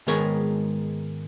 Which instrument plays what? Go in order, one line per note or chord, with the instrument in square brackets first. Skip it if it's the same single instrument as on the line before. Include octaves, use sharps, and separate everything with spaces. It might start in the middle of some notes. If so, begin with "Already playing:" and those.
[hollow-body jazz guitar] G#2 D#3 G#3 B3 A#4 C#5